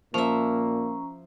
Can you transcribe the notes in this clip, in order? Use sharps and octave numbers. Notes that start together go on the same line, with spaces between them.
A#2 F3 A#3 C#4 E5 A#5